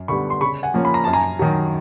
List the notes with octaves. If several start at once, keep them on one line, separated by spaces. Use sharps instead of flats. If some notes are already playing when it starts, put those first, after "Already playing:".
Already playing: F#2
D3 G3 B3 B5 C#6
C6
C#3 B5 C#6
F#5 G#5
F3 A#3 C#4
B5
A#5
F#2 A5
G#5 A#5
D#3 F#3